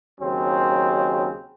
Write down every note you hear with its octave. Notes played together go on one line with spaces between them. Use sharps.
D#2 C#3 F#3 C4